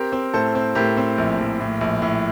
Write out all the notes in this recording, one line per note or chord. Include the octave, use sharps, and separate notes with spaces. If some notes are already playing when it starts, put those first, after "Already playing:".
Already playing: C4 G4 A#4
C4
A2 A4 C5
C4
A2 G4 A#4
C4
A#1
A#1
A2
A#1
A2